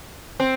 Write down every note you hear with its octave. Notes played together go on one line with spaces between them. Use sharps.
C4